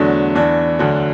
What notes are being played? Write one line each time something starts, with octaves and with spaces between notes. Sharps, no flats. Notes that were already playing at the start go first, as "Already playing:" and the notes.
Already playing: E2 D3 F#3 A3 D4
E2 E3 D4
D2 D3 F#3 D4